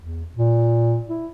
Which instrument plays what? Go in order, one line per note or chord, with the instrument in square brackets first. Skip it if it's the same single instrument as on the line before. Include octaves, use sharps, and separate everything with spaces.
[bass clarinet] E2
A#2
E4